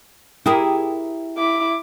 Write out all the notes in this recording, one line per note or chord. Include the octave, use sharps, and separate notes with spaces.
E4 G4 G#4 A#4
E4 D6